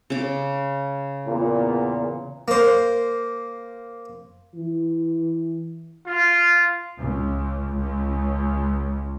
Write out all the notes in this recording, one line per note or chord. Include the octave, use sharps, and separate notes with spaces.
C#3 D6
E2 A#2
A#3 C5
E3
F4
C#2
C#2